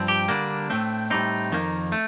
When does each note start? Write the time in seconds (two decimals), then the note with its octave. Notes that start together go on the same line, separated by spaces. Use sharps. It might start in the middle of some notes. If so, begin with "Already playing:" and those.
Already playing: G2 F3 C4
0.08 G4
0.28 D3 G3 A#3 D4
0.70 A2 A3 C4
1.10 A2 G3 C4 D#4
1.52 F2 D#3 A#3
1.92 A3